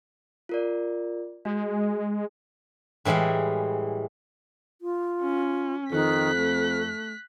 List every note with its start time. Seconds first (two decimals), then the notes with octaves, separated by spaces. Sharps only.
0.49 F4 A#4 D5
1.45 G#3 F#4
3.05 A2 E3 G3 G#3 F5
4.82 F4
5.22 C#4
5.92 F2 D#3 F#6 B6
6.36 A3